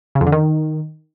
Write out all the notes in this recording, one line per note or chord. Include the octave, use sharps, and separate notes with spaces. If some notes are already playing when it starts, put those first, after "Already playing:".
C#3
F2
D3
D#3